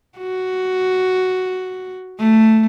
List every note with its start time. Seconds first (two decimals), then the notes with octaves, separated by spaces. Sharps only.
0.19 F#4
2.19 A3